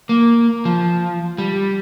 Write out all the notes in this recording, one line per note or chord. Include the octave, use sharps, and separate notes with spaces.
A#3
F3
G3